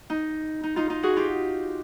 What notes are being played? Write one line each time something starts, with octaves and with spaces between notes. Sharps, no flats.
D#4
D#4
D#4 F4
D#4 F4
F#4 G#4
F4 G4